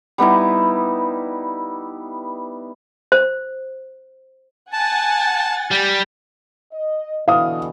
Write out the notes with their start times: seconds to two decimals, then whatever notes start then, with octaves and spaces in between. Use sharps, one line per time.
0.18 G3 B3 D#4 E4
3.12 C5
4.73 F#5 G#5 A5 A6
5.71 G3
6.73 D#5
7.28 B2 D3 E3 F5 D#6